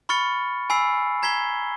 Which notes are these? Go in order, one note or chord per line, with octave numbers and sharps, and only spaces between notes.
B5 C#6 F6 A6 C#7
G#5 B5 E6 C7
A#5 G#6 B6 C7 G7